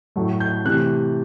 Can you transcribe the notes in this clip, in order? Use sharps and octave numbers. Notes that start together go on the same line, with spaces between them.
A2 F#3 A3
G6
C3 E3 A3 F#6